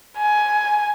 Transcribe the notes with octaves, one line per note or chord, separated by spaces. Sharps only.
G#5